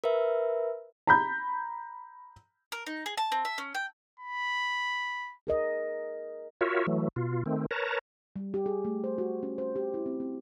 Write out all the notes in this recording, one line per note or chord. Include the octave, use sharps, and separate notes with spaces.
A#4 B4 E5
A#5 B5 G6
A#4
D#4
G#4
A5
C4
E5
C#4
G5
B5
G#4 A#4 D#5
F4 F#4 A#4 C#5 E5
E3 F#3 A3
B2 F4
D#3 A3 C4
A#4 B4 C#5 A5 A#5
G3
G4
G#4
A3
C5
F#4
C#4
C5
G4
E4
C4
C4